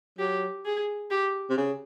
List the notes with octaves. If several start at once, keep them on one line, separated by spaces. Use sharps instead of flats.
F#3 G4
G#4
G4
C3
C#3